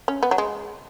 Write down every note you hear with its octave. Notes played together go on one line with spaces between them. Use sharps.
C#4
B3
F#3
G#3